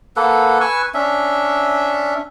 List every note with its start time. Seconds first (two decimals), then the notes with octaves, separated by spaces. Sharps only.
0.16 A#3 A4 B4 F#5
0.61 B4 G#5 C#6 E6
0.94 C#4 D4 E5